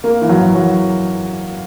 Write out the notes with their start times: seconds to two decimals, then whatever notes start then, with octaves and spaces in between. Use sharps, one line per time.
0.04 A#3
0.22 E3
0.29 F#3
0.55 F#3